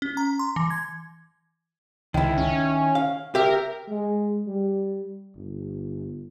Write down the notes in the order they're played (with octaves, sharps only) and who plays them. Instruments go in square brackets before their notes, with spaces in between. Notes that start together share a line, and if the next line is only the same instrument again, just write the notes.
[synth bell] C#4
A#5
C6
E3
G#6
[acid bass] C#2 [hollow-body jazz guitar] D#3 E4
[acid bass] C#4
[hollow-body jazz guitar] F5
[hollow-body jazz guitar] G4 E5 [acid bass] A#4
[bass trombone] G#3
G3
G1